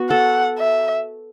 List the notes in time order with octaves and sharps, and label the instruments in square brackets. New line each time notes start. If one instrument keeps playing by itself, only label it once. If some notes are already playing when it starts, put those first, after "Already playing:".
Already playing: [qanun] B3 F#4
[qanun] A4 [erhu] F#5
[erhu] E5